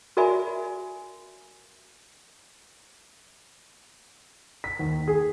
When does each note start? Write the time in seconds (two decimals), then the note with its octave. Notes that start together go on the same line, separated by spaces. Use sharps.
0.17 F#4 A#4 D5 E5 G#5 B5
4.64 B6
4.79 D#2
5.08 G#4